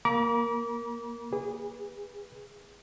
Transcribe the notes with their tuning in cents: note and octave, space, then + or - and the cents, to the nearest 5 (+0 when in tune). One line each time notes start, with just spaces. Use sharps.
A#3 +0 A#5 +45 D6 -25
G#4 -25 B4 -10